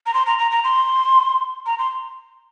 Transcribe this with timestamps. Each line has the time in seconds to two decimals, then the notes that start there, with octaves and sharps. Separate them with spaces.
0.06 A#5
0.14 C6
0.26 A#5
0.39 A#5
0.51 A#5
0.64 C6
1.66 A#5
1.79 C6